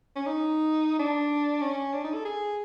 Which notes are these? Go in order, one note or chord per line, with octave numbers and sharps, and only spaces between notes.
C#4
D#4
D4
C#4
D4
D#4
A4
G#4